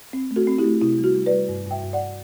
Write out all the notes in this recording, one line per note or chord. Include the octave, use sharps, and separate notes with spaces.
C4
A3
F#4 A4
C4
E4 G4
A3
C3 E4
G3
F#4
G3
B4 D5
G3
G2
G2
E5 G5
G2
D5 F#5